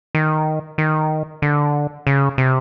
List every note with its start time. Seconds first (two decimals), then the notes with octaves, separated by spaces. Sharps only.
0.15 D#3
0.78 D#3
1.42 D3
2.07 C#3
2.38 C3